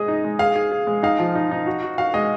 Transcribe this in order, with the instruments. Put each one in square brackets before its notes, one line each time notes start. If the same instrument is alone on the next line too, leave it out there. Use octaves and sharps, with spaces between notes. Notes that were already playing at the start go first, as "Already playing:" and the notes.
Already playing: [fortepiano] G#3 G#4 [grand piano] D#5
[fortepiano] D#4
G#3
[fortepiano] G#4 [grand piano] F5
[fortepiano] G#4
G#4
G#3
[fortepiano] D#4 [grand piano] F5
[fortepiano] F3
D#4
D#4
F#4
F#4
[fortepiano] F#4 [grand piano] F5
[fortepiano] G#3 [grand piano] D#5